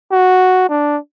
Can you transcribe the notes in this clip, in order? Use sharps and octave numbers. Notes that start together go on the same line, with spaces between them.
F#4
D4